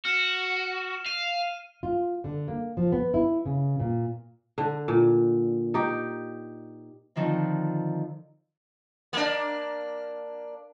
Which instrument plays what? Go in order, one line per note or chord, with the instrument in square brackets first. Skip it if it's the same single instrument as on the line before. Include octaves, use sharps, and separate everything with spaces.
[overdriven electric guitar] F#4 [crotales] F6 E7
[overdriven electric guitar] F5 [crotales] D#7
[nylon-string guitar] F4
D3
A#3
F3
B3
E4
C#3
A#2
[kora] D3
A#2
D#4 G4
[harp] D3 D#3 F3 C4
[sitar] A#3 D4